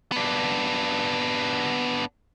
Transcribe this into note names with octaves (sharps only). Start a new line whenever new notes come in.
B3 D4